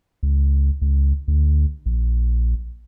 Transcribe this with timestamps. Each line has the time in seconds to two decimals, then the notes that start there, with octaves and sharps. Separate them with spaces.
0.23 C#2
0.82 C#2
1.28 D2
1.86 A#1